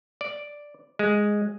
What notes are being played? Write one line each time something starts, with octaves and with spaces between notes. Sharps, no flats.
D5
G#3